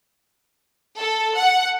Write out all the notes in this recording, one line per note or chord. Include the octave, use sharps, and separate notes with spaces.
A4
F#5